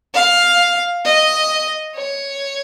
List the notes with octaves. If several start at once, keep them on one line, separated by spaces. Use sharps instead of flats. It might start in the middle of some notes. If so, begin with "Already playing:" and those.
F5
D#5
C#5